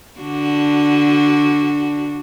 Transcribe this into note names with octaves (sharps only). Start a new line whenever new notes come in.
D3 D4 F#4